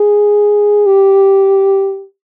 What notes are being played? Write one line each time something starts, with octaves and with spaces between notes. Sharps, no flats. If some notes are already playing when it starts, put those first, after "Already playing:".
Already playing: G#4
G4